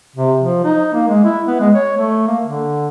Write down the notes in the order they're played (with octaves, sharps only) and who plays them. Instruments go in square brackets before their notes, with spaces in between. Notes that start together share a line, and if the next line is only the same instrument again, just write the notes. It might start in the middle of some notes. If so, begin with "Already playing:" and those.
[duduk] C3
F3
D#4
A#3
G#3
E4
B3
G#3
C#5
A3
A#3
D3